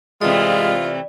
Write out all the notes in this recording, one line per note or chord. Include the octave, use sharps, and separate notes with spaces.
C3 E3 G#3 A3 F4 D5